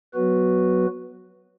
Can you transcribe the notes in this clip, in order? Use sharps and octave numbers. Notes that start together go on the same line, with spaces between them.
F#3 B3 F#4 B4